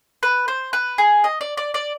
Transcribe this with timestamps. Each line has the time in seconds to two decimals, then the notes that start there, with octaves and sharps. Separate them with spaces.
0.23 B4
0.48 C5
0.73 B4
0.98 G#4
1.24 D#5
1.41 D5
1.57 D5
1.74 D5